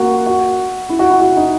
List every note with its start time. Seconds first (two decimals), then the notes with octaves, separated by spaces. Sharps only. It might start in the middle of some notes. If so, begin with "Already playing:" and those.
Already playing: A#3 F#4
0.26 F#4
0.89 E4
0.99 F#4
1.10 E4
1.21 F#4
1.37 D#4